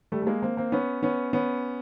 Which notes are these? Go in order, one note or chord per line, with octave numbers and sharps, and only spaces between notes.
G3 A3
A3
G#3 A#3
A#3 C4
A#3 C4
B3 C#4
B3 C#4
B3 C#4